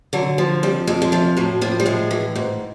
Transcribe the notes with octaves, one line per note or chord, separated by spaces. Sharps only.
D3 F#3
F3
F2 G3
F2 G#3
G#3
F3 A3
A2 F#3
F3 A#3
G3
A2 G#3
E3
G#2